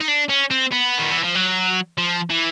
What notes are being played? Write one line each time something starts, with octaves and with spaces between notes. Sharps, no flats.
D#4
D4
C#4
C4
B3
D#3
E3
F3
F#3
F3
E3